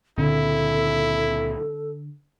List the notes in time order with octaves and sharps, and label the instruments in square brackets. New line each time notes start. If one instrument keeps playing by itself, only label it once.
[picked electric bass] C#2 A#2 C4 [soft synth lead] D3 [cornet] E4 [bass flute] A4